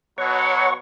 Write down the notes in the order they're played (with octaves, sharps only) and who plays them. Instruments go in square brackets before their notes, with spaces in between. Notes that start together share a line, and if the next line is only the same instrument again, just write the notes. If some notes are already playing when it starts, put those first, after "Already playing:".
[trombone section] B2 F#3 [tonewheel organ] C#5 F#5 C#6